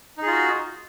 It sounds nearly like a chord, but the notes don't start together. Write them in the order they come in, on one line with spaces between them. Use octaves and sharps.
D#4 G#4 F4 F#4